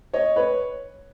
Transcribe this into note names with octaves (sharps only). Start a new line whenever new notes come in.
C#5 D#5
B4 C#5